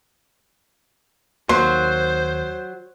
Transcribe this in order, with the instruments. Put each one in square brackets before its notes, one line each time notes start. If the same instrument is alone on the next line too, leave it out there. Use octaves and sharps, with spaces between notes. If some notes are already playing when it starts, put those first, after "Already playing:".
[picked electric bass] D#2 A#3 [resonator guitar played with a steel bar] F#3 [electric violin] C5 [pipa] C6